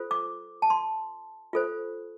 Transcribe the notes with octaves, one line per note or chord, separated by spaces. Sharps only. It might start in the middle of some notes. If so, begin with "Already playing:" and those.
Already playing: F4 A4 C5
D6
A5
C6
F4 A4 C5